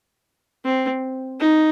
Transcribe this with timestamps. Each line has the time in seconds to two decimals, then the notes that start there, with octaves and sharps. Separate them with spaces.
0.65 C4
1.40 D#4